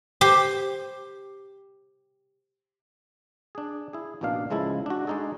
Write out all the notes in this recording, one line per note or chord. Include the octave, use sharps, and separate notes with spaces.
G4 C5
D4 G#4
E4 G#4
A1 B2 A#3 D4 F5
C#2 C#3 F3 G#3 E4 A4
D4 F#4
G#3 D4 D#4 G#4 A4